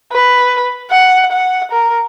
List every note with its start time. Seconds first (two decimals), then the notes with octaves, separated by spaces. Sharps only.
0.13 B4
0.91 F#5
1.32 F#5
1.71 A#4